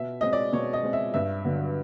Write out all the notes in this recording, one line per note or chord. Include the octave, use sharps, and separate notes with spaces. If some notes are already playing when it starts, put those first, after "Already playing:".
Already playing: B2 E5
G#3 C4 D#5
D5
B2 C#5
D#5
G#3 C4
E5
G2 E5
D3 F#3 B3